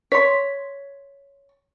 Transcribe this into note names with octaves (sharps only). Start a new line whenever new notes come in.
C#5 C6 B6